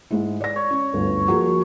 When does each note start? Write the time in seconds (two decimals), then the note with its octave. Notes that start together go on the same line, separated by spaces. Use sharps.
0.11 G#2 G#3 E4
0.40 D5 A#6
0.56 C#5
0.71 C#4
0.94 G1 D2
1.28 F3 F#3 A#3 G#4